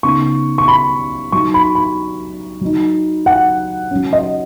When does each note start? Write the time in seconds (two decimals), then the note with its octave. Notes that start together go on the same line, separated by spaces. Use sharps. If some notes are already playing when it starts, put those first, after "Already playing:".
0.03 C#3 B3 D#4 C#6
0.58 C#6
0.68 B5
1.32 F#3 D#4 C#6
1.54 B5
1.75 B5
2.61 F#3 D#4
3.26 F#5
3.91 F#3 C#4
4.13 D#5